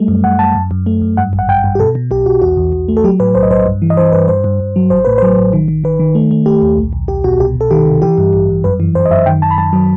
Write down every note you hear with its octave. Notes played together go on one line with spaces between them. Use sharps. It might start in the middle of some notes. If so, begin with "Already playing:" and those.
Already playing: G3 A3
F#2
F#2 F#5
F#2 A5
F#2
F#2
A3
F#2
G2 F#5
A1
F#5
G2 G5
G2
G4
B2 A4
B2
B1 G4
B1 F#4
E2 F#4
E2
E2
A3
A4
F#3 G4
A2 B4
B1 C5
D#5
B1 C5
G2
E3
D#5
E3 C5
G2 B4
G2 C5
G2
G2
F#3
A1 C5
A2 B4
F#3 C5
A1
D#3
D#3
D#3 B4
D#3
A3
A3
A3 G4
D#2
B1
B1
B1 G4
B2 F#4
C2 G4
C2
A4
D#3 G4
C3
E3 G4
G2
A1
G2
F#2 B4
E3
F#2 C5
D#5
F#2 E5
D#3 G5
D#3 A5
B5
F#2 A5
F#3